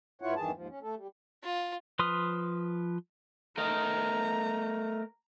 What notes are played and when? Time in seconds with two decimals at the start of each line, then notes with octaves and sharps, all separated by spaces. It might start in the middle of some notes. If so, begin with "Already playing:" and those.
0.22 G2 E4 F4 C#5 F#5
0.36 E2 G2 D#3 E3 G#4 A5
0.54 D#2 G#2 F3
0.69 C#4
0.83 A3 A4
0.96 G3
1.43 F4
1.99 F3 B4 C6 D#6 F6
3.58 A3 A#4 D#5 A#5